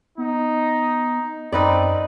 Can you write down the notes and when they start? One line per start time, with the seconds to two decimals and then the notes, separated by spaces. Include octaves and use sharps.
0.18 B3 D#4
1.52 F#2 C4 D#4 B4 D5